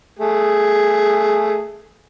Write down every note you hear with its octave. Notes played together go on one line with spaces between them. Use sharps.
A3 G#4